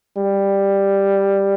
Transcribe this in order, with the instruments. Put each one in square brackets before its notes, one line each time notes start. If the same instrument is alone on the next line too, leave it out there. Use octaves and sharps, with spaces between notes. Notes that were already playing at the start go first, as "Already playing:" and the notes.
[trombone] G3